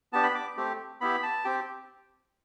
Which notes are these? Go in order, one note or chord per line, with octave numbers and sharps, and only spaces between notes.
B3 D4 G4 A5
B5
D6
A3 C4 G4
B3 E4 G4 B5
A5
C4 G4 G5